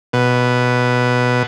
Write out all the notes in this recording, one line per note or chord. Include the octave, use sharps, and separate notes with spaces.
B2